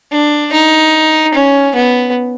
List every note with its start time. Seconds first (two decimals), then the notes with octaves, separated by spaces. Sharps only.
0.11 D4
0.53 D#4
1.34 C#4
1.75 B3